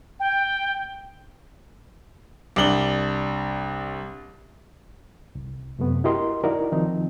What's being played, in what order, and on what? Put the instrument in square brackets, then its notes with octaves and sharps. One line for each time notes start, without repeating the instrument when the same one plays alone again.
[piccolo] G5
[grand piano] C2 D4 F#7 G7
[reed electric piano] C2
F#2 C3 A3 B3
E4 F#4 G4 A#4 D#5 C6
D#4 E4 F#4 A#4 D5 D#5
D#3 F3 C4 D#4